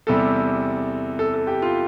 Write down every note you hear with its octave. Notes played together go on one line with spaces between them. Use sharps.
E2 C3 G3 A4
A4
A4
G4
F4